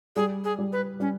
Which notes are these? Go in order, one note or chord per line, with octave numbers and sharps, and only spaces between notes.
G3 G#4
G#4
G3
B4
G3 C#4